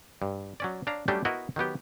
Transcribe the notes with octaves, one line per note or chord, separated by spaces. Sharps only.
G2
F#3 C#4 D5
D4 C#5 F5 A#5
F#3 G3 A3 C#4 D4 G4
B3 E4 F#4 A#4 D#5
D#3 F#3 B3 G4